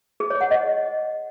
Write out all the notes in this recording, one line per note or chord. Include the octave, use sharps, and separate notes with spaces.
G#4
C#5
F#5
D#5